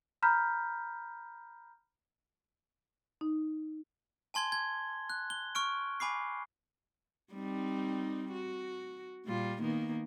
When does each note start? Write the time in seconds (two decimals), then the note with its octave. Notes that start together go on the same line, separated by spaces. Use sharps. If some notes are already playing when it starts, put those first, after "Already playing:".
0.22 A#5 B5 F6 G6 B6
3.21 D#4
4.34 G#5 A5 C6 G#6 G7
4.52 G#6
5.10 F#6
5.30 G7
5.55 C#6 F6 D7
6.00 G#5 B5 D6 C7
7.34 G3 C4 D#4
8.33 F#4
9.26 A#2 G3 F4
9.61 D#3 A#3 B3